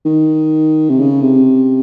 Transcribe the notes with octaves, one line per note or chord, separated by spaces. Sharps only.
D#3
C3
C#3
C3